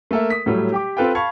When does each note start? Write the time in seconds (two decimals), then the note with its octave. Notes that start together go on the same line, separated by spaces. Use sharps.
0.11 A3 A#3 A4 A#4 E5
0.30 D#6 B6
0.46 A2 F#3 G3 A3
0.72 G4 G5 D6
0.97 C4 F4 A4 B4 F5 G5
1.15 F5 A5 B5 C#6 G#6